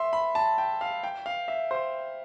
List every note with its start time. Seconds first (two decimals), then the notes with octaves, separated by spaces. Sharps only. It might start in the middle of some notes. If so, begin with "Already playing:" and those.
Already playing: E5 C6
0.13 B5
0.35 A5
0.58 G5
0.81 F5
1.03 G5
1.26 F5
1.48 E5
1.71 C5